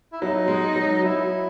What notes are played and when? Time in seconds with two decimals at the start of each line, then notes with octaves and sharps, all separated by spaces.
0.12 E4
0.21 F#3 D#4
0.48 G#3
0.76 F#3
1.03 F#3 E4